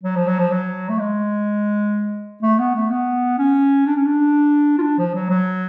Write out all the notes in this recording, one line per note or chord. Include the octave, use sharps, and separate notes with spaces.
F#3
F3
F#3
F3
F#3
A3
G#3
A3
B3
A3
B3
C#4
D4
C#4
D4
F4
D4
F3
F#3
F#3